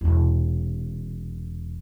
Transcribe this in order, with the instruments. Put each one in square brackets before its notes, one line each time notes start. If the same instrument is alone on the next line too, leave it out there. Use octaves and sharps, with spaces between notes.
[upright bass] E1 C3